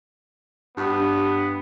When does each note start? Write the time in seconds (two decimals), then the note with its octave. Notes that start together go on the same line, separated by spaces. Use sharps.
0.77 G2 B3